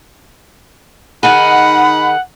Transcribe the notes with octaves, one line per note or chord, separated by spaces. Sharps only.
D#3 D#4 G#4 F#5 B5